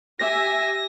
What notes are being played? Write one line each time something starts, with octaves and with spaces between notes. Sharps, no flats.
G4 E5 G#5 A#6